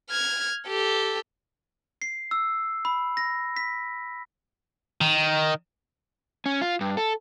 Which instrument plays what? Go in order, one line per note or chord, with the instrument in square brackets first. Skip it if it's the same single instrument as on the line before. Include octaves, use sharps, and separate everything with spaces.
[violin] F6 G#6
G4 A4
[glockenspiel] C7
E6
B5
A#6
B6
[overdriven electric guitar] D#3
[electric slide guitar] C#4
F4
G2
A4